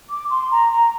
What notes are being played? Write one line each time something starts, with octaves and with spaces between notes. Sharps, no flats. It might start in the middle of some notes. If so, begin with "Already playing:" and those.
D6
C6
A#5
A#5